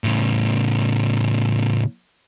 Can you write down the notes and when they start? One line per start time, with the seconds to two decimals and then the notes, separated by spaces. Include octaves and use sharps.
0.04 A2 C#3